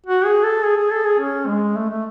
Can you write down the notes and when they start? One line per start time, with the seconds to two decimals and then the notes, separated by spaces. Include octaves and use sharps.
0.07 F#4
0.25 G#4
0.44 A4
0.63 G#4
0.77 G#4
0.91 A4
1.05 G#4
1.20 C#4
1.47 G#3
1.76 A3
1.90 A3